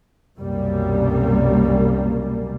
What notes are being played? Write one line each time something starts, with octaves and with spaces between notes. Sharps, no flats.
C2 F#2 B2 G3 A#3